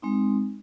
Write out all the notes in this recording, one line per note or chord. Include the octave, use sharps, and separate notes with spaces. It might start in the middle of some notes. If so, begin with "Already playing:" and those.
G#3 C4 D#4